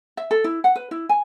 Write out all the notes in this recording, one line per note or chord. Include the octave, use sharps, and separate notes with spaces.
E5
A4
E4
F#5
B4
E4
G#5